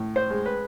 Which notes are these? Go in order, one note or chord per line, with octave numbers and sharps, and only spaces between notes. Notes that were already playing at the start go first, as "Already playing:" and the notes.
Already playing: A2
C5
G#3
B4